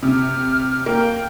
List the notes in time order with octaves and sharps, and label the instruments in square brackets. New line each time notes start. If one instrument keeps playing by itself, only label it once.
[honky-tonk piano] C3 [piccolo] F6
[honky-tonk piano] A#3 [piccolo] G5